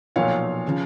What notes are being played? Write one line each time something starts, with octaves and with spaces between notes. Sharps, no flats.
B1 A#2 F3 C#5 F5
C#3 F3